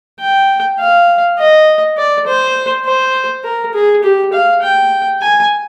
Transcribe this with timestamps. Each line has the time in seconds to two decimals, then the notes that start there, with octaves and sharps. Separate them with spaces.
0.20 G5
0.79 F5
1.38 D#5
1.97 D5
2.27 C5
2.85 C5
3.44 A#4
3.74 G#4
4.03 G4
4.33 F5
4.63 G5
5.21 G#5